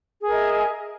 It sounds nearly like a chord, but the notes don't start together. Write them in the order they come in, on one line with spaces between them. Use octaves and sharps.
G#4 A#4 D#5 E5